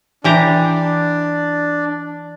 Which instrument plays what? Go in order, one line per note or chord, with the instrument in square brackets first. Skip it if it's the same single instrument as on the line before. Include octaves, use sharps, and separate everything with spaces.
[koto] E3 G4 A#5 [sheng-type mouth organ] D4